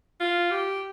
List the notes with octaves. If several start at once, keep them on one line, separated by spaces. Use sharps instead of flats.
F4
G4